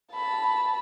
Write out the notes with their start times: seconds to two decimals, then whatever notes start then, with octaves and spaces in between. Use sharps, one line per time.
0.13 A5 B5